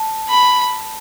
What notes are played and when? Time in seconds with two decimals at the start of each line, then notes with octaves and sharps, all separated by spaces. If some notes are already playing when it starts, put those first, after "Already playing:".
Already playing: A5
0.29 B5